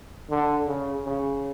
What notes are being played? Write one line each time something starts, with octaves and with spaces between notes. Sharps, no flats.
D3
C#3
C#3